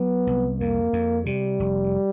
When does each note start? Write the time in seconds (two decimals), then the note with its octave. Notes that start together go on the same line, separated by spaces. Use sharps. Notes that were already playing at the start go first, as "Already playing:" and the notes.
Already playing: F#3 B3
0.27 C2
0.60 F2 A#3
0.93 F2
1.26 C3 G3
1.60 F1